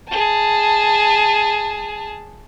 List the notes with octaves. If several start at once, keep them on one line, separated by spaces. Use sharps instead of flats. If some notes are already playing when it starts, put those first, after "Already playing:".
G#4 A5